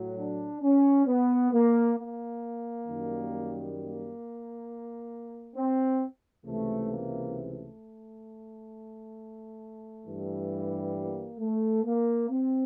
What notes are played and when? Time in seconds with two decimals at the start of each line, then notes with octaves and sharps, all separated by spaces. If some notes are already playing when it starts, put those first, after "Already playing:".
Already playing: A2 F#3
0.17 D4
0.62 C#4
1.07 B3
1.52 A#3
1.97 A#3
2.87 F#2 D#3 G3
3.76 A#3
5.56 C4
6.46 C#2 C3 E3 A3
6.91 A#3
7.35 A3
10.05 G2 E3 G3
10.94 A#3
11.39 A3
11.84 A#3
12.29 C4